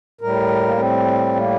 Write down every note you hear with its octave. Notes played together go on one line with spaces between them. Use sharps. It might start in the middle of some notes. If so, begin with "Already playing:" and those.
A2 G3 A#4
A#3
C4
A#3